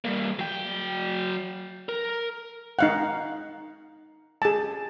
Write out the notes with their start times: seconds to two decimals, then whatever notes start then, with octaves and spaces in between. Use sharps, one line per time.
0.05 G3 A#3
0.39 F#3 G5
1.89 A#4
2.79 D#4 F5 F#5
4.42 G#4 A5